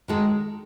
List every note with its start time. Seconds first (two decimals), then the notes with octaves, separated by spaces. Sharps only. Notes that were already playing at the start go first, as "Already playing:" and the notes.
0.08 D#3 G#3 C#4 F#4 A4